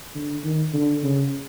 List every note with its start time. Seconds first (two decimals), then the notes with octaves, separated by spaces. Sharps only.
0.15 D3
0.44 D#3
0.73 D3
1.03 C#3